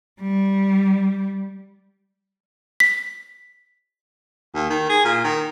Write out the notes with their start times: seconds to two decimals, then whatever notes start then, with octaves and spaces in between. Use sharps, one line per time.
0.21 G3
2.80 B6
4.55 D#2
4.70 D#3
4.89 G#4
5.05 A#2
5.24 D#3